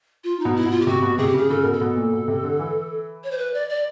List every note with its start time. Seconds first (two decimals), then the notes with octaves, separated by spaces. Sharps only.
0.24 F4
0.40 D#4
0.45 B2
0.56 E4
0.66 B2
0.71 F4
0.81 G4
0.87 C3 F#4
1.02 B2
1.18 C3 G#4
1.28 G4
1.34 C#3 G#4
1.50 C#3 A4
1.61 B2 A#4
1.73 A4
1.81 B2
1.96 A#2
2.13 B2
2.28 C3
2.44 D3
2.59 E3
3.24 C#5
3.31 C5
3.38 B4
3.54 D5
3.69 D5